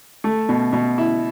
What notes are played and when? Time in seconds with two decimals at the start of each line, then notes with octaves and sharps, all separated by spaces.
0.24 A3
0.49 B2
0.73 B2
0.98 E4